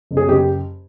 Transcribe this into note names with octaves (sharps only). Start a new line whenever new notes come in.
F#1
G#4
F#1 G4